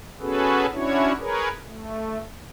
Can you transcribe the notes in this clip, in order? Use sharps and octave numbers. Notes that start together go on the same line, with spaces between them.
B3 C#4 F#4 G#4 A4 B4
C#4 D4 E4 F#4 C#5
G#4 A#4 B4 C#5
A3